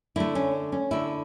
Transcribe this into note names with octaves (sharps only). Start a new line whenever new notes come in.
D3 A3 E4
C#4
C#4
D3 A3 E4